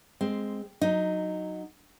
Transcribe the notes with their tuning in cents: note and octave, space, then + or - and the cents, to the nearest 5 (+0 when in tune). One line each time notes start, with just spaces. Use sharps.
G#3 +0 C4 +0
F#3 +0 D#4 +0